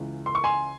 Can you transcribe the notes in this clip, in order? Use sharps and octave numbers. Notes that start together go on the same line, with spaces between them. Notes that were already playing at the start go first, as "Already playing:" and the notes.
Already playing: C#2 C#3 E3
C6
C#6
G#5 C6